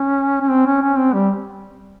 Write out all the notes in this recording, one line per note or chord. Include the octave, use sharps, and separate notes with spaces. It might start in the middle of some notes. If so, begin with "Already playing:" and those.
Already playing: C#4
C#4
C4
C#4
C#4
C4
G3